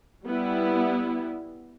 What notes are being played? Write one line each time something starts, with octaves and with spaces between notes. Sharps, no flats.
G3 B3 E4